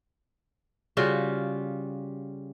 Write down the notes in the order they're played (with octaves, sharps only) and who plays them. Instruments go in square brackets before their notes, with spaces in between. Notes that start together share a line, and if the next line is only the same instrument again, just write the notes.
[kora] C#3 G3 F4 F#4